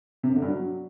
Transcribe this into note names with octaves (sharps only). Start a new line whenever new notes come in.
C3
F#2
D3
G2
F#3